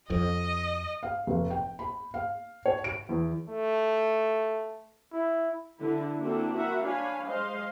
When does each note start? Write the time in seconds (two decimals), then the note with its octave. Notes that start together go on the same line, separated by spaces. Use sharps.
0.10 F2 D#5
1.03 F5
1.27 F1
1.50 G5
1.79 B5
2.14 F5
2.66 C#5
2.84 D7
3.09 E2
3.50 A3
5.13 E4
5.79 D3 E4
6.18 A#3 C4 D4 E4 F#4 A4
6.55 F#4 A#4 E5 F#5 B5
6.83 D4 C#5 F5 G#5 B5
7.28 G#3 C5 D#5 F5 C6